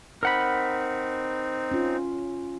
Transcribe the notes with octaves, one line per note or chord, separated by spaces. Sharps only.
C4 D#4 A#4 F#5 B5
C#4 F4